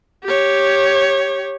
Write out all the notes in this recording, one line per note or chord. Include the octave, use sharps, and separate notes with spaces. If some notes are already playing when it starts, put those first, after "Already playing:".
G4 C#5